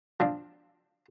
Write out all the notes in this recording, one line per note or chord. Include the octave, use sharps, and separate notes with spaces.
F3 C4 D4